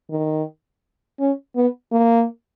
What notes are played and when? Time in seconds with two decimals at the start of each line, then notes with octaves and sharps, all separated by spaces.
0.10 D#3
1.19 C#4
1.56 B3
1.92 A#3